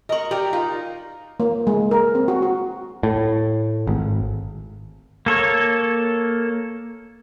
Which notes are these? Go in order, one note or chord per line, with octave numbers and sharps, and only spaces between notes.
A#4 D#5 C#6 F#7
G4 A#4 D5
D#4 F4
A#3
G#3
A#4
C4
F#4
F#4
A2
G#1
A#3 A4 C#5